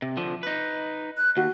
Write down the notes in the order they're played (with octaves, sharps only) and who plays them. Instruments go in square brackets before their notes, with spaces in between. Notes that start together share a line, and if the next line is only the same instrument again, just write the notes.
[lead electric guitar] C3
D3 F3
D#4 B4
[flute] F#6
[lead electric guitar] D#2 [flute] F#4